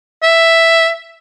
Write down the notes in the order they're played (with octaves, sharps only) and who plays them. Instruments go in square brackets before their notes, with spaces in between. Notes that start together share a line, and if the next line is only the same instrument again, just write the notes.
[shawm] E5